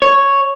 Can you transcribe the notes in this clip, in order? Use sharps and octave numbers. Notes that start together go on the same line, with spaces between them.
C#5